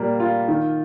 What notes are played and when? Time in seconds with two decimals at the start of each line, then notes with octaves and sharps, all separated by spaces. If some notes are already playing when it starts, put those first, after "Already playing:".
Already playing: A#2 G3 A#3
0.20 F4
0.48 D#3